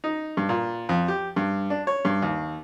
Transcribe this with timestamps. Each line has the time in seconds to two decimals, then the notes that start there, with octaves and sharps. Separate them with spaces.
0.04 D#4
0.37 G2
0.49 A#2
0.89 F2
1.08 G4
1.36 G2
1.70 D4
1.87 C#5
2.05 G2
2.22 D#2